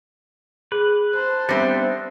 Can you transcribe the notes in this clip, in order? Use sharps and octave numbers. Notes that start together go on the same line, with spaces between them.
G#4 B4
C5 A5 F#6
G3 B3 C4 D4 A4 E5 A#6